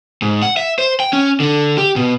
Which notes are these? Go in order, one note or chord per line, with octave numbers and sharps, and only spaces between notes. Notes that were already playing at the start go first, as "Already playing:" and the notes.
G#2
F#5
E5
C5
G5
C#4
D3
G4
B2